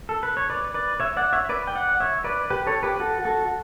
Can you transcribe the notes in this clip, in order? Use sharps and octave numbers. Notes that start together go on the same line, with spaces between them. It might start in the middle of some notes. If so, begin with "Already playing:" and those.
A4
B4
C#5
B4 D5
B4 D5
C#5 E5
D5 F#5
C#5 E5
B4 D5
G5
D5 F#5
C#5 E5
B4 D5
G4 B4
A4 C#5
G4 B4
F#4 A4
F#4 A4